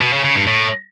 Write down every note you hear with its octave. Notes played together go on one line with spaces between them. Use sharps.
B2
C#3
C#3
G2
A2